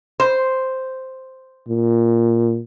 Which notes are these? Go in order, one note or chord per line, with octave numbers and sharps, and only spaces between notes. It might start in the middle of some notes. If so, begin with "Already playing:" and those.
C5
A#2